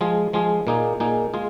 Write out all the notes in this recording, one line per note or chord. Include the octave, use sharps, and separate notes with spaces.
F3 G#3 F4 G#4
F3 G#3 F4 G#4
A#2 A#3 D#4 G#4
A#2 A#3 D#4 G#4
G#3 F4 G#4